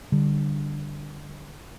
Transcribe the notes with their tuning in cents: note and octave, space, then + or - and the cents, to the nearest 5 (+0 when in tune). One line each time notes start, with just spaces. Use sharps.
D3 +0 G3 +5